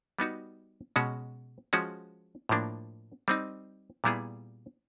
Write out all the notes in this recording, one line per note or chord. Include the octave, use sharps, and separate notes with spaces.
G3 B3 D#4 F#4
B2 G#3 C#4 F#4
F3 G#3 C#4 F#4
A2 F3 A#3 D4
G3 C4 D#4
A#2 G3 B3 E4 G#4